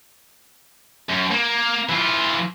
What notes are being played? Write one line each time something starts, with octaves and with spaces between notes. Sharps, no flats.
F#2
A#3
E3 F4